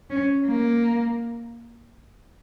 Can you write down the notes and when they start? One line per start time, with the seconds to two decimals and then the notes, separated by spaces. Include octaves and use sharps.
0.10 C#4
0.47 A#3